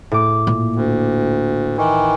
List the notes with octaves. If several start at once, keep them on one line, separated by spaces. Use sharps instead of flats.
A2 D6
A#2
D2
D#3 E3